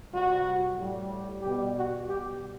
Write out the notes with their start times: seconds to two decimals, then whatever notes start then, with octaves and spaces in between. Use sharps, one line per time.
0.11 C3 G3 F#4
0.76 A2 G3
1.42 B2 G3 G4
1.74 F#4
2.07 B2 G3 G4